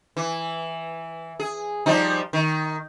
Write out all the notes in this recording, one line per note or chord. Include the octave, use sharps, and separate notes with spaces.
E3
G#4
F3 G3 D#4
D#3